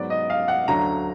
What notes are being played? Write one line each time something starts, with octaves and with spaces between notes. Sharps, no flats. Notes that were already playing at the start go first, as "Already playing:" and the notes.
Already playing: G#2 F#3 B3 D5
D#5
F5
F#5
D2 D3 F#3 A#5